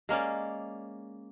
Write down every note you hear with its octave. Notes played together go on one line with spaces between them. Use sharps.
G#3 A#3 C#4 D5